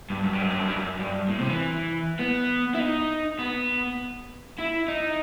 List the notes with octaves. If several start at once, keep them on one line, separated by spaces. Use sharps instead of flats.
G2
F#2
G2
F#2
G2
F#2
G2
F#2
G2
A2
C3
E3
B3
E4
D#4
B3
E4
D#4